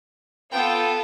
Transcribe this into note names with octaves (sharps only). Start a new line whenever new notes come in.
B3 F4 A4 G5